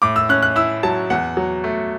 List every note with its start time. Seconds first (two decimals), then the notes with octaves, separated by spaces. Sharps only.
0.02 A2 D6
0.16 E6
0.29 C#4 F#6
0.42 F#6
0.56 E4 E6
0.83 F#3 A5
1.10 E2 F#5
1.37 F#3
1.64 A3